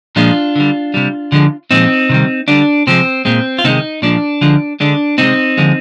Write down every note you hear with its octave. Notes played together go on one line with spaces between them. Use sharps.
A#2 F3 G#3 D4 F4
D3 G3
C3 G3
D3 F3 G#3
A#2 F3 G#3 C4 D#4
C3 D#3 G3
D3 G3 D4
C3 F3 G#3 C4
A#2 G#3 C4
F4
C3 D#3 G#3 C4 D#4
A#2 F3 G#3 D4
D3 F3 G#3
D3 G#3 D4
C3 F3 G#3 C4 D#4
D3 F3 G#3